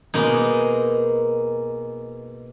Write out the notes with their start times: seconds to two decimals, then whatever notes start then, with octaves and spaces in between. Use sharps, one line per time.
0.14 B2 G#3 A#3 D#4